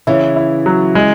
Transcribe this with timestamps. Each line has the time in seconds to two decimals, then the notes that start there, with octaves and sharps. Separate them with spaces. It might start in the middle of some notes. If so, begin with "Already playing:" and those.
0.07 C#3 E3 E4
0.36 E4
0.66 F#3
0.95 G#3